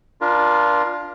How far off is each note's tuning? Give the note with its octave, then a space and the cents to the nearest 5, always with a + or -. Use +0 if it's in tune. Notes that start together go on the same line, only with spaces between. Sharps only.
D4 +0 F4 +0 A#4 +30